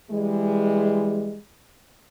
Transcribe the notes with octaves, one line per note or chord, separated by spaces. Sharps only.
E3 G3 G#3